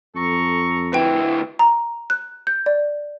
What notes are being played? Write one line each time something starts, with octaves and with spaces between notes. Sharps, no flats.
F2 A4 A#5 C#6
D2 E4 B4 G5
A#5
F#6
G6
D5